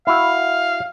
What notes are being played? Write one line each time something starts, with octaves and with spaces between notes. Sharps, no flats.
E4 F#4 F5